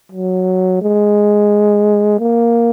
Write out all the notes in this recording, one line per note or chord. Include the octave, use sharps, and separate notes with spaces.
F#3
G#3
A#3